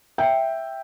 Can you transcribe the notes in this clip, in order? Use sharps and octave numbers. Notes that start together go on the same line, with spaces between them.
E5 G5